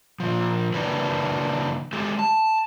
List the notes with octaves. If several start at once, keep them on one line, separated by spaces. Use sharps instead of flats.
A#2 F3
C#3 E3 F#3 A#3 D4 B4
G#3 G4 A4
A5